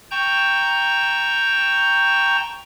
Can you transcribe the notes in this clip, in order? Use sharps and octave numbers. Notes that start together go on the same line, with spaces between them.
G5 A5 A#5 C#6 G6